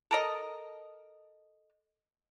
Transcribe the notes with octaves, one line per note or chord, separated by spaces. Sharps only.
A4 A#4 D#5